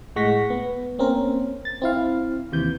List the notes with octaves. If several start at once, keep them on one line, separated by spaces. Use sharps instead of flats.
A2 G#3 F#5 C#6 A#6 B6
B3
A#3 C4 C#4 A#4
A6
C4 E4 F5
D#2 C3 E3 G6